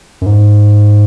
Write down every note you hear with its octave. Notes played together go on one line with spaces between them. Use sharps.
F#2
G#2